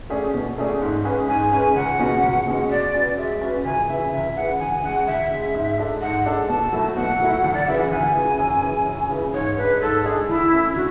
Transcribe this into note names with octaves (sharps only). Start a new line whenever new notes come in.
A3 C#4 G#4 D5
B2
A3 C#4 G#4 D5
G#2
G#3 C#4 G#4 B4
G#2 G#5
G#3 C#4 G#4 B4 G#5
C#2 F#5
B2 G#3 C#4 F#4
C#2
B2 G#3 C#4 F#4
G#3 D5
C#4 F#4 B4
G#3 E5
C#4 F#4 B4
C#2 G#5
C#3 E3 E5
C#2 E5
C#3 E3 F#5
D2 G#5
C#3 G#3 F#5
D2 E5
C#3 G#3
G#2
G#3 D4 A4
G#2 F#5
G#3 D4 A4
B2 A5
F#3 A3 E4
B2 F#5
F#3 A3 E4
D2
D5
C#3 E3 E5
F#5
D2 G#5
C#3 E3
F#2
C#3 E3
F#2
C#3 E3
G#2 C#5
G#3 D4 B4
G#2 A4
G#3 D4 G#4
D3 E4
A3 C#4
D3 F#4